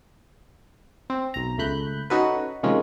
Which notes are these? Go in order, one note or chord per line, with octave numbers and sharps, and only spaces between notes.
C4
B1 A#5
C#2 A3 B5 F#6 G6
C#4 D#4 F#4 A4 B4
C3 D#3 F3 G#3 A#3 C#4